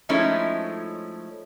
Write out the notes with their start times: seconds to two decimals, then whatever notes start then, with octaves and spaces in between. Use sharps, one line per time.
0.09 F3 G#3 A3 C#4 D#4 E4